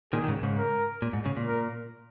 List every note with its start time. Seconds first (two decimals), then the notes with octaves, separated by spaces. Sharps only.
0.13 A#2 D#3 G#4
0.24 D#3
0.28 G#2 C#3
0.43 G#2 C#3
0.58 A#4
1.02 A#2
1.13 G#2
1.25 G#2 C#3
1.37 A#2
1.47 A#4